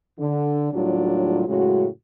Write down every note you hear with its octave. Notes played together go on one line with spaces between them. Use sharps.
D3
D#2 A2 F#3 G3 D4 F4
F#2 A2 C#3 G#3 F#4